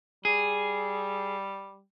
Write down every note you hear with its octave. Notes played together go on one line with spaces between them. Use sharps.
G3 G#4